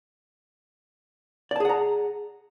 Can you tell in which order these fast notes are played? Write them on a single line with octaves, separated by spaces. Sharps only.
D5 A5 G#4 F#5 A#5